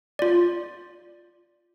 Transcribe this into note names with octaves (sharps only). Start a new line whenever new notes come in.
F4 D5